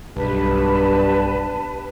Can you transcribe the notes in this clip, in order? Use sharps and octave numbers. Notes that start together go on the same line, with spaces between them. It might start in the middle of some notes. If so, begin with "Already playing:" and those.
B1 G2 B4 A5